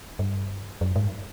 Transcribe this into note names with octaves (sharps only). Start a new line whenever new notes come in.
G2
F#2
G#2